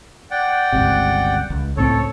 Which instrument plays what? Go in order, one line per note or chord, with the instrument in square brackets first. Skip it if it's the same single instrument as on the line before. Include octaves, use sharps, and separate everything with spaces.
[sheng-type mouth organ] D5 F#5 G5
[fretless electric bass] G1 C#2 C3
C#2
[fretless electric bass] C#2 A2 C4 [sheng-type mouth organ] A4 C#5